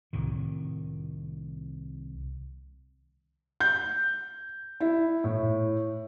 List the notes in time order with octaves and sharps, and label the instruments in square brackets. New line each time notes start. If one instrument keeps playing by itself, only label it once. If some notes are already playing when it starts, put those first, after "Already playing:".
[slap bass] C2 A2 D#3
[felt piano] G6
E4
A2